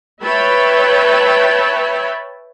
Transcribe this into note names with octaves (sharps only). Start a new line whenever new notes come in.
B4 C#5 E5 G5 A5 B5